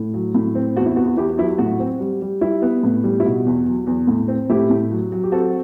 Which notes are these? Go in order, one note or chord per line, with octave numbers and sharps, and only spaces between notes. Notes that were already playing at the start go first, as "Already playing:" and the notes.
Already playing: A2
F#3
A2
C4
E2 F#4
E4
B3 F#4
F#4
E2 E4 G4
F#3 E4 G4
A2 F#4
C4
G3
G3
G3 E4
B3
A2
G3
E4
B2 F#4
E2
F#3
E2
A2
C4
A2 E4 G4
A2
F#3
F#3
G4
C4 F#4 A4